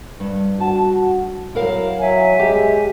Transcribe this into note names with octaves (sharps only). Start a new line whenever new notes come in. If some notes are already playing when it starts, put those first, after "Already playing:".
G2
F#4 A5
F#3 E4 A#4 F5
F#3 E5 G#5
G#3 G4